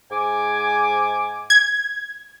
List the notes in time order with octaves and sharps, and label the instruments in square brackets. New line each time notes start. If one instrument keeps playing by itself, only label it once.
[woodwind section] G#2 G#5 D6
[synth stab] G#6